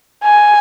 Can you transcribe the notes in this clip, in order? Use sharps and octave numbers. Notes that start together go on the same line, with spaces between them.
G#5